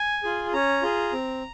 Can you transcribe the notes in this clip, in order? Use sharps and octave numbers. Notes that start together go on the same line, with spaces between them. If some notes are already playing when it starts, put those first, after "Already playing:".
Already playing: G#5
F4 G#4
C#4 A#5
F4 G#4
C4